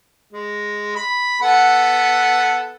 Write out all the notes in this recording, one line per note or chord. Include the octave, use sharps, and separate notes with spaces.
G#3
B5
B3 A4 F#5